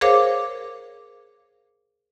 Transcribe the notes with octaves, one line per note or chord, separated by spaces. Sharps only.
G#4 A#4 C5 C#5 F5 D6